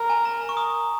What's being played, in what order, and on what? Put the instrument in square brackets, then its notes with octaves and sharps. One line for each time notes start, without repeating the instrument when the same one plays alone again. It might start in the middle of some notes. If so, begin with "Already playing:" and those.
Already playing: [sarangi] A#4
[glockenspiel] G#5
A#5
A#5
C#6
D#6